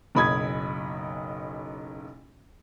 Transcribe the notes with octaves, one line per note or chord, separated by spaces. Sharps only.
F#1 B1 B5 D#6 G#6